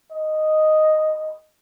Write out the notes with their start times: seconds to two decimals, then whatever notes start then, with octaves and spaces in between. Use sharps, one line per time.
0.12 D#5